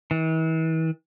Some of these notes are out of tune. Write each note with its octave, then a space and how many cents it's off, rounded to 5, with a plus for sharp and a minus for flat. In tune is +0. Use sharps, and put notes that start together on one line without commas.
E3 -40